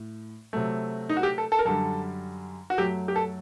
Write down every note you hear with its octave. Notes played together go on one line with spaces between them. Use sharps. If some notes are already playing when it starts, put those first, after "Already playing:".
Already playing: A2
C3 F#3 A3
D#4
F#4
G4
A4
A4
A#4
F#2 D3 G3 A4
F#4
F#2 F#3 A3 G4
G4
A4